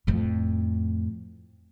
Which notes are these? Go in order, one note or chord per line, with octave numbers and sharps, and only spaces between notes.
F2 A2